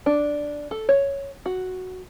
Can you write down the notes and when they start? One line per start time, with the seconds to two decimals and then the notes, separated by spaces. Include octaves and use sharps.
0.06 D4
0.71 A4
0.89 C#5
1.46 F#4